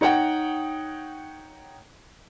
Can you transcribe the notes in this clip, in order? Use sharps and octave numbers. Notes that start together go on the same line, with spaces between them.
D#4 C#5 F#5 G5